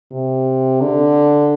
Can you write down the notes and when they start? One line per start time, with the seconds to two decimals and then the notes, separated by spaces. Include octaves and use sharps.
0.11 C3
0.81 D3